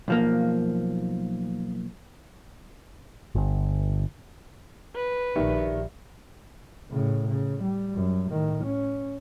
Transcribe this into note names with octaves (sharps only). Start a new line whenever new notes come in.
B1 F3 A#3
G1
B4
A#1 D#3 G4 D5 E5
A2 C#3
C#3
G3
F#2
A2 D#3
C#4